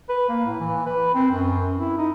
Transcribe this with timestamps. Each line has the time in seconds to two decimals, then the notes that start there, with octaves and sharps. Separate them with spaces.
0.09 B4
0.29 A#3
0.46 A2
0.60 E3
0.86 B4
1.15 C4
1.30 F#2
1.78 E4
1.98 D#4